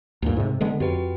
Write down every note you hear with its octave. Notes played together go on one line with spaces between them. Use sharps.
D2 G2 A#2
G#2 C3
D3 G#3 B3
F2 F#4 G4 B4